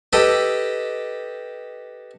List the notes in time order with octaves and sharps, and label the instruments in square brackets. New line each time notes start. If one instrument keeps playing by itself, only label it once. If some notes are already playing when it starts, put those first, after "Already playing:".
[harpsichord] G4 A4 B4 D#5 G5